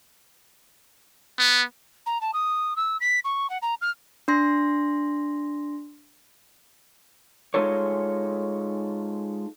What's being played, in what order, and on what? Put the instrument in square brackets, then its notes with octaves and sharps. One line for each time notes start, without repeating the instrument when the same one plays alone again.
[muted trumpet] B3
[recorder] A#5
A5
D#6
E6
B6
C#6
F#5
A#5
F6
[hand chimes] D4 C6 A#6
[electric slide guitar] G#3 D#4 F4 A4 C#5